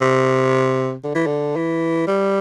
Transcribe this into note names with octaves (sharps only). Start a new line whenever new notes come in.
C3
D3
E3
D3
E3
G3